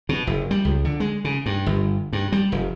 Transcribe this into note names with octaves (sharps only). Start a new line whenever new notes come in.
B2
F#1
G3
C#2
D3
G#3
C#3
G2
G1
G2
G3
F1